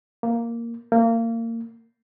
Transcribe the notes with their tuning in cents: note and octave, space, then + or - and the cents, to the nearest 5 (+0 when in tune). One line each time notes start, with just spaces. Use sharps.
A#3 +0
A#3 -25